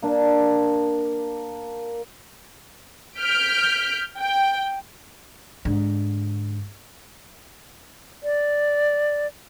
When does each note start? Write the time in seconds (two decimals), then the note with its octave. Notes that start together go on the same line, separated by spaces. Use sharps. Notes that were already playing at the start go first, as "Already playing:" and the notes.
0.02 A#3 D4
3.20 F6 G6 B6 D7
4.19 G5
5.65 G#2 D3
8.23 D5